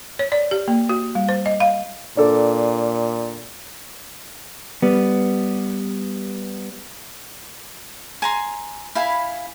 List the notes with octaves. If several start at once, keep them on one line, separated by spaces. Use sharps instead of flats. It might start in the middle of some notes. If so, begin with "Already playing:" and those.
C#5
D5
G4
A#3
F#4
G3
C5
D#5
F5
A#2 D4 A4 D5
G3 B3
G#5 A#5 C6
E4 F5 G#5 B5